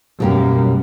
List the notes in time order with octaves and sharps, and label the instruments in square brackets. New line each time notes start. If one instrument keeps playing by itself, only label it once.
[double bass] F#2 [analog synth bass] B2 [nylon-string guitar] G3 A#3 G4